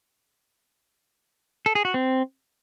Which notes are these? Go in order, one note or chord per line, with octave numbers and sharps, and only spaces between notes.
A4
G#4
F#4
C4